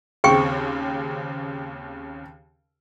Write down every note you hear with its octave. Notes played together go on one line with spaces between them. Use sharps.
D#2 C#3 C4 G#4 G5 C#6